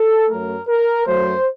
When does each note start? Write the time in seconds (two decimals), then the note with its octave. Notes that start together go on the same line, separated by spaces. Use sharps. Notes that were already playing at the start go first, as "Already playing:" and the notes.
Already playing: A4
0.29 F#2 F#3 A3 A#4
0.68 A#4
1.06 F#2 F#3 A3 C5